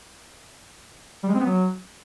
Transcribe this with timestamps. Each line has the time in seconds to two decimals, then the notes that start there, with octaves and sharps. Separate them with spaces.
1.23 G3
1.29 G#3
1.35 C4
1.40 B3
1.46 F#3